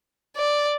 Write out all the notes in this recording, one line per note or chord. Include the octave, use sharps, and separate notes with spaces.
D5